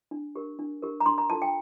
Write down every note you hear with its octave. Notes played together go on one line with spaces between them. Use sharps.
D4
G4 A#4
D4
G4 A#4
A#5
D4 C6
A#5
F4 A4 A5
G5